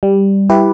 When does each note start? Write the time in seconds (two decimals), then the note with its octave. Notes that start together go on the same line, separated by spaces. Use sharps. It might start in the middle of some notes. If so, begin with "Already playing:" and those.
0.03 G3
0.50 E4 G4 B4